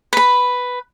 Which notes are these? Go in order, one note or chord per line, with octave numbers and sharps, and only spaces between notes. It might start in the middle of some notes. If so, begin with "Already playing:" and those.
B4 B5